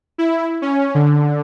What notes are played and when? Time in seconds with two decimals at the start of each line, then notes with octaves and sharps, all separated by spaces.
0.18 E4
0.62 C#4
0.95 D3